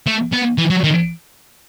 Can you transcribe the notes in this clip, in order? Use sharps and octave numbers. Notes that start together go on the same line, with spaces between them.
A3
B3
E3
F#3
D#3